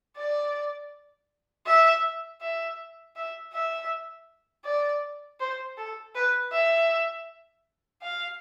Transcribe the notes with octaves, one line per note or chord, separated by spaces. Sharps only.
D5
E5
E5
E5
E5
D5
C5
A4
B4
E5
F5